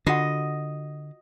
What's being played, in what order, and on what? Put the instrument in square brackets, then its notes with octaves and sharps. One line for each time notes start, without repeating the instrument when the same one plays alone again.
[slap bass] D3 [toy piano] F4 F#4 F#5 [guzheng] D#5